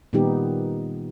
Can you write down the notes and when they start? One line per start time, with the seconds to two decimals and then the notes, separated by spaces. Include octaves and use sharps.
0.13 A#2 D#3 G3 B3 D#4 G4